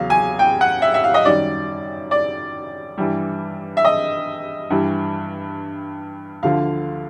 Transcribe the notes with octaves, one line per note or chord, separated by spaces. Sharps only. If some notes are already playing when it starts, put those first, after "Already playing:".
Already playing: E2 C#3 F#3 F5
G#5
G5
F#5
E5
E5
F5
D#5
F#2 D#3 G3 D5
D5
G2 E3 G3
E5
D#5
G2 E3 G3
D2 D3 F3 F5